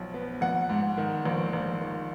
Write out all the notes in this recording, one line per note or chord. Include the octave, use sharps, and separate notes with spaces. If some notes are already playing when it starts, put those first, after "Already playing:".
Already playing: B1 F3
B3
A#1 F#5
G#2
D#3
A#1
A#1
D#3